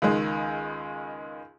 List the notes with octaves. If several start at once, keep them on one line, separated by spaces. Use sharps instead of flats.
C#2 D#3 G#3